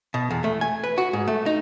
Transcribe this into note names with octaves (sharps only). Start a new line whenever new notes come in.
B2
E2
A3
G#5
B4
F#4
G#2
A3
D#4